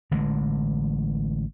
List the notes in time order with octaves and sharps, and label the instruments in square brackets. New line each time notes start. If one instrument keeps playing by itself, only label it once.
[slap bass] A1 D3 E3 G#3